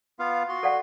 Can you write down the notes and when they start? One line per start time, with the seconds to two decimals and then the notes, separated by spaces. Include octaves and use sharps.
0.19 B3 F4 F5
0.49 F#4 C6
0.63 A4 D5 F#5